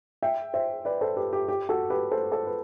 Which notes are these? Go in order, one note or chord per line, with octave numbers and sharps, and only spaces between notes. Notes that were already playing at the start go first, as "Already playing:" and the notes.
E5 G5
C5 E5
B4 D5
A4 C5
G4 B4
G4
G4
F#4 A4
G4 B4
A4 C5
A4 C5
B4